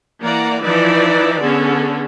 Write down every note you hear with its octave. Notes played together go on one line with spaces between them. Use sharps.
E3 A#3 D5 F#5 A#5
E3 F3 D#4 E4 B4 D5
D3 B3 C#4 G#4 A4